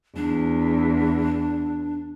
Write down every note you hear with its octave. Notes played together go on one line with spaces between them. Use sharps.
E2 D4